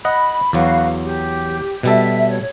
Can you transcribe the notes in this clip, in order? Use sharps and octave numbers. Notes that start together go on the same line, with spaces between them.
D#5 F#5 B5
E2 F#3 F#4 B4 F5
G4
B2 G3 A4 E5
C#5